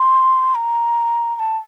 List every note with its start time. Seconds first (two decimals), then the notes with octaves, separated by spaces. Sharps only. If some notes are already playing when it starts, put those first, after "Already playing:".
Already playing: C6
0.55 A#5
1.36 A#5
1.39 A5